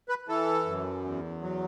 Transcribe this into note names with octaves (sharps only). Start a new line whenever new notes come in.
B4
E3 A4
F#2
E2
F#3